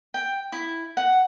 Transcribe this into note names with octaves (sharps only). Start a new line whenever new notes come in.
G5
E4
F#5